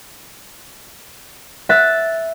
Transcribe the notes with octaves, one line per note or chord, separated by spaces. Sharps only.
E5 F#6 A6